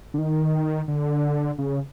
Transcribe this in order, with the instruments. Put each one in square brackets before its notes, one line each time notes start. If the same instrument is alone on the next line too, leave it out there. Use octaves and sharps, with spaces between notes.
[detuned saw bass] D3
D#3
D3
C#3